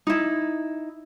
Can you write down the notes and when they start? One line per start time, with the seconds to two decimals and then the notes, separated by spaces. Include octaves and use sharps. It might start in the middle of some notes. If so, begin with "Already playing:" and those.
0.07 D#4 E4